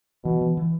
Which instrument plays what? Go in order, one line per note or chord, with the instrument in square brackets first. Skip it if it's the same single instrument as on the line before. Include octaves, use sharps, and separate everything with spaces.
[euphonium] B2 [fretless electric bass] E3
[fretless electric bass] E3
E3